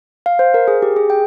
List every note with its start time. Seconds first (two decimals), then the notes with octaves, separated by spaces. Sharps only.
0.26 F5
0.39 C5
0.54 A#4
0.68 G#4
0.82 G4
0.96 G#4
1.10 G5